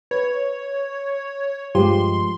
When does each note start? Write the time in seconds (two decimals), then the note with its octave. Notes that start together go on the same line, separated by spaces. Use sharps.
0.11 B4 C#5
1.75 G2 F3 G#3 G4 C6